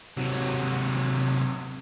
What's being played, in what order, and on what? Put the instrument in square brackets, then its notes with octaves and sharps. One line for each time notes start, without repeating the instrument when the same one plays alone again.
[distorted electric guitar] C3 F#3